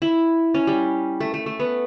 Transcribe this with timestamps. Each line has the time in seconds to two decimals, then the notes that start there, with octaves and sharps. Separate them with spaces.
0.02 E4
0.54 C#4
0.67 G3
1.20 A3
1.34 A3
1.46 A3
1.60 B3